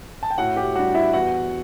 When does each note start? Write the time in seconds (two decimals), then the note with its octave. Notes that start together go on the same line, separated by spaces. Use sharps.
0.23 A5
0.30 G5
0.38 A2 F#4 F#5
0.56 G4 G5
0.75 G3 D4 F#4 F#5
0.94 E4 E5
1.13 E2 F#4 F#5